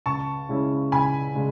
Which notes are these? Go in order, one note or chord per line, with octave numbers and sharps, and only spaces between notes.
C#2 A5 C#6
C#3 G#3 C#4 E4
C#2 G#5 B5
C#3 G#3